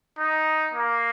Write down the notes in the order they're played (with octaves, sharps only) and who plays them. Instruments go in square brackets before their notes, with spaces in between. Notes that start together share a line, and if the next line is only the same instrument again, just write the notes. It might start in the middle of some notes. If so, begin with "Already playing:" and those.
[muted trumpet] D#4
A#3